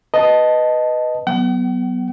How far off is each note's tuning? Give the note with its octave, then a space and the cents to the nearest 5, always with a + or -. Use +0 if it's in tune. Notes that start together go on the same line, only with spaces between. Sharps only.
B4 +0 D#5 +0 A5 +0
F#3 +15 B3 -5 F#5 +45